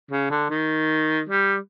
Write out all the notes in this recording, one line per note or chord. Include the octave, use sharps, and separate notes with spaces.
C#3
D3
D#3
G3